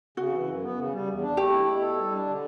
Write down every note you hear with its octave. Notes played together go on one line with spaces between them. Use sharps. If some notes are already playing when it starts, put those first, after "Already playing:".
C#3 F#4
E3
F#2
B3
C#3
G3
E2
D4
A3 G4
E4
B2
A4
G3
D4
D3